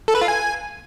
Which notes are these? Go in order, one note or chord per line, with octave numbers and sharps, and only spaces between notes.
A4
B4
F4
G#5